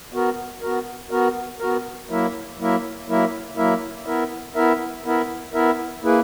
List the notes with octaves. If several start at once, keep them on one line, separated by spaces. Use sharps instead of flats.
B3 F#4 A#4
B3 F#4 A#4
B3 F#4 A#4
B3 F#4 A#4
F#3 A#3 E4 A#4 E5
F#3 A#3 E4 A#4 E5
F#3 A#3 E4 A#4 E5
F#3 A#3 E4 A#4 E5
B3 E4 A#4 E5
B3 E4 A#4 E5
B3 E4 A#4 E5
B3 E4 A#4 E5
A#3 E4 G#4 B4